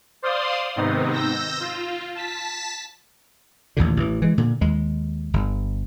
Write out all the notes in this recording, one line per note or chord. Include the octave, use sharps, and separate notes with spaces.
C5 D5 F5 C6 D#6
G#2 C3 D#3 B3 C4 D#4
E6 G6 A#6
F4
A5 B6
A1 D#2 A#2 D3
A1 E3
E3 G#3
A#2 D3
D#2 G#3
G1